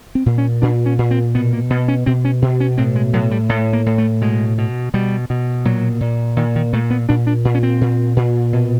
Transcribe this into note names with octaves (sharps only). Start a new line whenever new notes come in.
C4
A#2
C#4
A#2 D4
C#4
A#2
C4
B2 B3
A#3
B2 B3
C#4
B2 C4
C#4
B2
C#4
A2 C4
G#3
A2 F#3
G3
A2 A3
A#3
A2
A3
B2 G#3
B2
B2 G3
B2
A#2 F#3
A#2
A#2 D#3
D#3
A#2 A3
B3
A#2 D4
D4
A#2
C#4
C4
A#2
A#2
B2